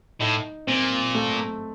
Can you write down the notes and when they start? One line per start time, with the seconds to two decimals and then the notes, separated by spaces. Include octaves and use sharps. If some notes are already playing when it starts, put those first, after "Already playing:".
0.20 A2 D#4
0.67 A#2 C4
1.15 A3